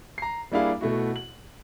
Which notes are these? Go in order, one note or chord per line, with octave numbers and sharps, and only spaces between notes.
A#5 C7
G3 A#3 D4 E4 G#4 F5
B2 A3 E4 F#4
F#7